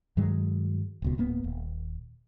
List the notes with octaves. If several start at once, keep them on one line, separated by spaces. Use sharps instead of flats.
G2 D#3 F#3 G#3
D#1 C#2 B2
D1 A#3 B3
D#1